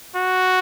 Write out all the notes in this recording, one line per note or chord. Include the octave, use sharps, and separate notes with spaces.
F#4